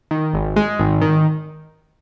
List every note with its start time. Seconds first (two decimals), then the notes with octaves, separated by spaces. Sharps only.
0.11 D#3
0.34 G#1
0.56 G#3
0.79 G#1
1.02 D#3